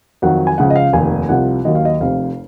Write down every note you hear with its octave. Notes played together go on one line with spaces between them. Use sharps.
F2 D#3 F#3 F#5
G#5
C#2 C#3 F3 F#5
D#5
F5
F1 D#2 D#3 G#5
C2 C3 F3 F#5
D#2 D#3 F#3 D#5
F5
D#5
F1 F2 C3 F5